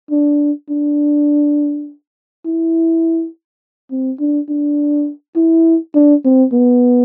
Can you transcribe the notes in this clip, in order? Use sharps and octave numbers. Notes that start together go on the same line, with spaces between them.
D4
D4
E4
C4
D4
D4
E4
D4
C4
B3